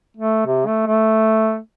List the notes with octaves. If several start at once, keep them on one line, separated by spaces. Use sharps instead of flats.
A3
C3
A3
A3